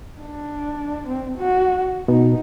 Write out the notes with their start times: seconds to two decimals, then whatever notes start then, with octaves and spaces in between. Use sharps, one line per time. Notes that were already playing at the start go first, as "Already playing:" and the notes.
0.21 D4
1.06 C4
1.38 F#4
2.08 B2 D#4